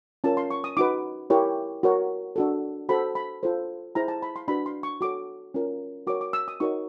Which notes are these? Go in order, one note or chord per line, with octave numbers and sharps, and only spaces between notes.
C#4 F4 A#4 A5
C6
C#6
D#6
D#4 F#4 B4 D6
E4 G4 A#4 C#5
F#4 A#4 C#5
D4 F#4 A4
F#4 A4 C5 B5
B5
F4 A4 C5
E4 G#4 C5 A#5
A5
B5
C6
D4 F#4 B4 B5
C6
C#6
F#4 A4 C#5 D6
C#4 F4 A#4
F#4 A#4 C#5 D6
D6
E6
D#6
D#4 F#4 A#4 C#5 C#6